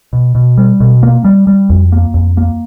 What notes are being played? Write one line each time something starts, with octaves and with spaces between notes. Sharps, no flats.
B2
B2
G3
B2
A#3
G3
G3
F2
A#3
F2
A#3